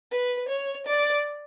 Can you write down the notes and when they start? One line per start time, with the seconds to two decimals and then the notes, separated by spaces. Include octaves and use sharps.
0.12 B4
0.49 C#5
0.87 D5